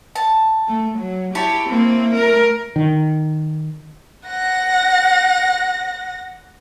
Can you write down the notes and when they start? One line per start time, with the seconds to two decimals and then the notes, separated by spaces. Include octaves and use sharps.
0.16 A5
0.68 A3
0.98 F#3
1.35 E4 G4 C#5 A5
1.68 A#3 C4
2.15 A3 A#4
2.76 D#3
4.25 F#5 A#6